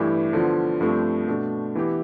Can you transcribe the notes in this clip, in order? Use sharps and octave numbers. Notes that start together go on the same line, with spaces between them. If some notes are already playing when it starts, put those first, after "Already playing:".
Already playing: G2 E3 A3 E4 G4
D3 F3 B3 F4
G2 F3 A3 C4
B2 A3 D4
E3 B3 E4 G4